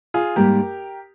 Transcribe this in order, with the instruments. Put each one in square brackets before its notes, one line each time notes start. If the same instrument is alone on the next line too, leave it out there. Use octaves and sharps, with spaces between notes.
[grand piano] F4 G#4
[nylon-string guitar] G#2 G3 A#3 [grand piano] G4 A#4